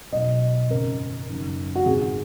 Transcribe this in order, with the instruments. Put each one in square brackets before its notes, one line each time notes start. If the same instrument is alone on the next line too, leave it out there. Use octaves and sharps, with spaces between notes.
[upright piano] B1 B2 D#5
G#1 F#2 C#3 A#4
F#1 F#2 D#3
F#4
G#1 F#2 C#3 G#4